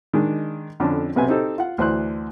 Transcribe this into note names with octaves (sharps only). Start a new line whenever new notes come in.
D#3 G#3 D4
F2 D3 C#4 D4
B1 C3 B4 G#5
C4 D#4 G4 A4
F4 F#5
D2 E3 C5 C6 F#6